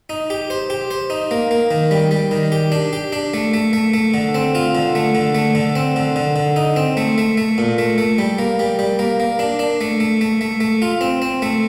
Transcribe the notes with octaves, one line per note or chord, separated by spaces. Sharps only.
D#4
G4
C5
G4
C5
D#4
A#3
A#3
D#3
G3
G3
D#3
G4
D4
G4
D4
A3
A3
A3
A3
D3
C4
F4
D3
A3
D3
A3
D3
C4
D3
D3
D3
D#4
C4
A3
A3
A3
A#2
A3
A3
G3
A#3
G3
G3
A#3
A#3
D4
D4
A3
A3
A3
A3
A3
F4
C4
C4
A3